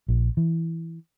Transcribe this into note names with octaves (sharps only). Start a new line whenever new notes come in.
A#1
E3